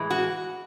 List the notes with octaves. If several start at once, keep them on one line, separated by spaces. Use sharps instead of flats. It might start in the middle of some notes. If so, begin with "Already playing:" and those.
Already playing: A2 E3 G#3
F#4